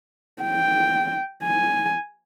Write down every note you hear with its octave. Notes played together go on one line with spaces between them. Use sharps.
G5
G#5